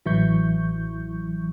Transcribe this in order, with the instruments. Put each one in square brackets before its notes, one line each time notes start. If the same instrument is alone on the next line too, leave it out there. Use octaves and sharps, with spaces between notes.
[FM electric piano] A1 E3 F#3 E4 C#6 G6